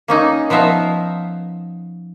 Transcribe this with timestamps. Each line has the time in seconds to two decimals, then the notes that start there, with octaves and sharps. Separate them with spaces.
0.08 A#3 C#4 D#4
0.50 F3 B3 D#4 E5 F5 A#5